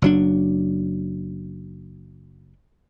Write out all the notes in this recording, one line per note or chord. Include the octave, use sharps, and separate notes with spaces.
F#1 F#3 D4